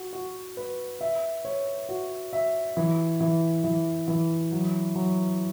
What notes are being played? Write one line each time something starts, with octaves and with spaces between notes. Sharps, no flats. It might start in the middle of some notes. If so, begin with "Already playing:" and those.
Already playing: F#4
F#4
B4
E5
C#5
F#4
E5
E3
E3
E3
E3
F#3
F#3